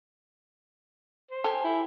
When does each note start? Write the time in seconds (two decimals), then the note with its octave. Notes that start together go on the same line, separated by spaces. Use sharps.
1.31 C5
1.44 G4 A4 G#5
1.64 E4